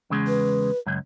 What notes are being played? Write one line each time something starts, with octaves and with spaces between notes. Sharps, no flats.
E2 C#3 G#3
B4
C#2 F#2